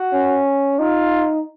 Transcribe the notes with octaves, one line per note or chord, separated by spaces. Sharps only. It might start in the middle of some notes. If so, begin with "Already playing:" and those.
Already playing: F#4
C#4
D#4 F4